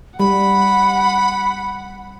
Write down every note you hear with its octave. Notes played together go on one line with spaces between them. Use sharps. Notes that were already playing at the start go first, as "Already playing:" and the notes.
G3 F#5 B5